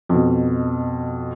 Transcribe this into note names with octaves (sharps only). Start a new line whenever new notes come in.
F2 B2